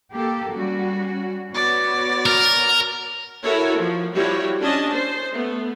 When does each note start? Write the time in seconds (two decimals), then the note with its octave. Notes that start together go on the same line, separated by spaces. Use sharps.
0.14 A#3 G4 A4
0.54 G3 C#4 F#4
1.54 B3 F#4 C#5 D5
2.26 A#4
3.42 E4 F#4 A4 A#4 C#5
3.79 F3
4.14 F3 G3 E4 F#4 G4 C#5
4.61 C#4 D4 D#5 A5
4.91 C5
5.32 A3 B3